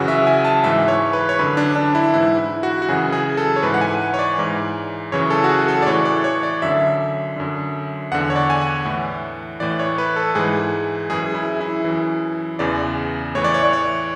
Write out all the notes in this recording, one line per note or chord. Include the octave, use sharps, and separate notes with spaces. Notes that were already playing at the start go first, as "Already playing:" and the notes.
Already playing: F#2 C#3 E3 F#4
E5
G#5
A5
G#2 E3 E5
C#5
B4
C#5
F#2 D3 B4
D4
D4
E4
G#2 E3 E4
E4
F#4
F#4
F#2 C#3 E3 G#4
G#4
A4
C#5
G#2 E3 B4
F#5
G#5
C#5
D5
G#2 E3
F#2 C#3 E3 C#5
A4
F#4
G#4
A4
D5
A2 E3 C#5
D5
C#5
D5
F#2 D3 E5
F#2 D3
E2 D3 F#5
C#5
D5
G#5
F#5
A2 E3
A2 E3 D5
C#5
B4
A4
G#2 E3 G#4
F#2 E3 G#4
E4
E4
E3
F#2
E2 C#3 E3 D5
A2 E3 C#5
D5
C#5
D5
C#5